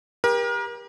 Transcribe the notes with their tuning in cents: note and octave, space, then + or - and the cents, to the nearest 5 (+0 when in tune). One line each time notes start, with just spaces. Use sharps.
G4 +25 A#4 +35